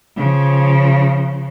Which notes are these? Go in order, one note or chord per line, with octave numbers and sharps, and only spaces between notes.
C#3 F3